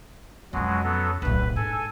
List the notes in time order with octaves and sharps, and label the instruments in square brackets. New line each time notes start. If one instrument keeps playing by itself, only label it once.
[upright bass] F2 C#4 [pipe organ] B2 F#3 G#3
[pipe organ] F#3 B3 A4
[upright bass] D1 B1 [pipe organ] B4
[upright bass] G#2 [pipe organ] A4 G#5